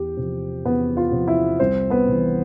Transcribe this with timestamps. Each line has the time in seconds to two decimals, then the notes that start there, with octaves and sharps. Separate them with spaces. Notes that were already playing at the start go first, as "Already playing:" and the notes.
Already playing: E2 G4
0.17 C3 F3
0.65 E2 B3 B4
0.97 F4 F5
1.12 C3 F3
1.28 E4 E5
1.60 C2 C4 C5
1.90 B3 B4
2.07 C3 E3